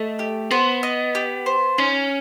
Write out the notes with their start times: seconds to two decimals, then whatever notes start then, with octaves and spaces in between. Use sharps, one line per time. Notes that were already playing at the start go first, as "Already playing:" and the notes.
Already playing: A3 D#5
0.19 G4
0.51 B3 C5
0.83 D#5
1.15 G4
1.46 C5
1.78 C#4 D#4